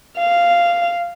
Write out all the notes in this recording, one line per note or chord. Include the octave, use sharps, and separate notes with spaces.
F5